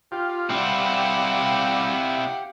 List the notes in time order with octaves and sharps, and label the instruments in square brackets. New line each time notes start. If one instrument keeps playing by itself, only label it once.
[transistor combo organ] F4 [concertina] G4 G5
[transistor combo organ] G3 [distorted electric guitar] C4 E4 [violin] F5 F#5